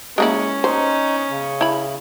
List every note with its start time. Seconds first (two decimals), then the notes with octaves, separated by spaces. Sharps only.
0.18 G#3 A#3 C#4 E4
0.64 D#4 C5
1.30 C#3
1.61 E4 B5